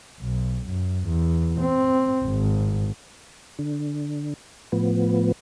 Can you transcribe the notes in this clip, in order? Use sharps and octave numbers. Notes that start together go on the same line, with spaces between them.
B1
F#2
E2
C4
G#1
D3
A2 F3 B3